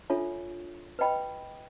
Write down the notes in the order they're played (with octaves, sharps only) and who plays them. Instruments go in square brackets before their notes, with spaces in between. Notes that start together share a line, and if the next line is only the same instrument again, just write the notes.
[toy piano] D4 F4 A4 C#5 E5
B4 D#5 G5 B5